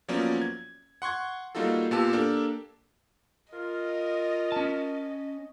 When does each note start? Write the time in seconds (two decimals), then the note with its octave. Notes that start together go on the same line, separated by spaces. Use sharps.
0.08 F3 F#3 A#3 B3 C#4 D5
0.42 G#6
1.02 F#5 C6 C#6 G#6
1.55 G3 A#3 D#4 F4 F#4 A4
1.91 A#2 B3 F4 G4 A5 E6
2.13 A#3 D4 G4 A4 A#4
3.53 F4 A#4 D#5
4.52 C#4 A5